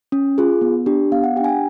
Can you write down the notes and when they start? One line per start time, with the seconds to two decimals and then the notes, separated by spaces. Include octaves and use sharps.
0.12 C#4
0.38 F4 G#4
0.61 B3
0.86 D4 G4
1.12 B3 F5
1.24 F#5
1.36 G4 G5
1.40 D4 G#5
1.49 G5